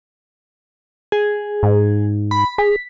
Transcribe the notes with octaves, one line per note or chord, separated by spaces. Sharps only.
G#4
G#2
B5
G#4 B6